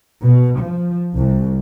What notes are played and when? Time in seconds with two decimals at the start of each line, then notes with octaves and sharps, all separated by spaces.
0.23 B2
0.60 F3
1.16 C2